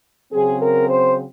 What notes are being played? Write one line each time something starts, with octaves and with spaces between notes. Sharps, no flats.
C#3 F#3 C4 G#4
A#4
C5